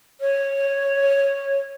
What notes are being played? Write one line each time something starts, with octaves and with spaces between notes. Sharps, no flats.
C#5